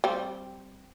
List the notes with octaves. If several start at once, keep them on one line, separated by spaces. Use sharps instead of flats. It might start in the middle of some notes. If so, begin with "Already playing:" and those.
G3 C4